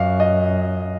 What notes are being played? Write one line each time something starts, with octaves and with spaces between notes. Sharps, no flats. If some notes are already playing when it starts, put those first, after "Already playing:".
Already playing: F#2 D#5 F5
D#5